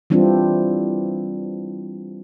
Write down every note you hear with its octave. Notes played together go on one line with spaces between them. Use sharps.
E3 G3 C4 D4 E4 F4